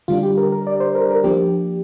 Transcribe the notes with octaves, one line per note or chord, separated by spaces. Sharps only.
D3 G3 D4 F4
G4
A#4
A#4
D5
C5
A#4
A#4
F3 A#3 D4 G4